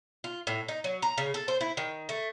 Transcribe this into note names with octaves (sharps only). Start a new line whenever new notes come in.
F4
A2
D#4
F#3
A#5
C#3
A4
C5
E4
D#3
A3